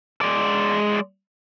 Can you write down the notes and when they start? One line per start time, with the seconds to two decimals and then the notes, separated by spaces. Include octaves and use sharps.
0.21 G#3 D5